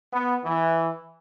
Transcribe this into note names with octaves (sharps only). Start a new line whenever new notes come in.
B3
E3